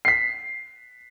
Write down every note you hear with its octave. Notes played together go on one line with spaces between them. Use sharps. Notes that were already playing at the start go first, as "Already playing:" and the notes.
B6 C7